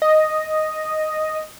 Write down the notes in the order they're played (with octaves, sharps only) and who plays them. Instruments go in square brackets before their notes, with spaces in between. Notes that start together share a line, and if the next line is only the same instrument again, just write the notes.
[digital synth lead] D#5